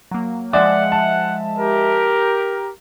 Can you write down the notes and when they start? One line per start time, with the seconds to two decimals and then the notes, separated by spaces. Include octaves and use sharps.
0.11 F#3 A#3
0.53 F3 G#3 D5 E5 F#5
0.92 A5
1.58 G4 A#4